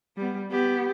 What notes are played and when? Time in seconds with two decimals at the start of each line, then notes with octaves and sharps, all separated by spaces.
0.17 G3 B3
0.51 B3 G4